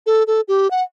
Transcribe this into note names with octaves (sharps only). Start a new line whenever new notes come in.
A4
A4
G4
F#5